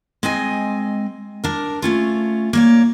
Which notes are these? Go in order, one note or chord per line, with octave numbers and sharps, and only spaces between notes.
G#3 C4 D#5 G#5
D4 A#4
A3 C#4 F4
A#3 C#5 D5